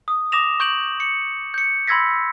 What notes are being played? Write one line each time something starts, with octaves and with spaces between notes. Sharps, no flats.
D#6
D6 D#6 A#6 E7 F7
C#6 G6 D7 F#7
C#7
G6 C#7
B5 C6 E6 G#6 A#6 B6